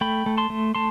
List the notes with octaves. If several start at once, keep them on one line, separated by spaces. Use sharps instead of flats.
A3 G5 B5
A3
A5 C6
A3
A3 A5 C6